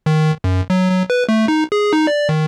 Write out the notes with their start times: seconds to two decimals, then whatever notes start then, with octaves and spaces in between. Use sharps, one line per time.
0.06 D#3
0.44 F#2
0.70 F#3
0.90 F#3
1.10 B4
1.29 A3
1.48 D#4
1.72 G#4
1.93 D#4
2.07 D5
2.29 D#3